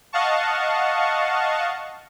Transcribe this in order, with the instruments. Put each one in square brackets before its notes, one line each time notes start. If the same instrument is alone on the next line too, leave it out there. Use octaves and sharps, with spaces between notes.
[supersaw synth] D#5 F5 F#5 A5 C#6